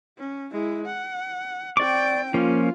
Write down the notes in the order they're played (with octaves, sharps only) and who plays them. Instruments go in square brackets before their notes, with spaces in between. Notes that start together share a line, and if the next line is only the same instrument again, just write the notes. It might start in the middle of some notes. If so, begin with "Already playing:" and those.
[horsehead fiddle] C#4
G#3 E4
F#5
[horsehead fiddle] C4 G5 [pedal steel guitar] D5 C#6 D6
[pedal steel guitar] F3 A#3 C#4 [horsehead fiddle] F4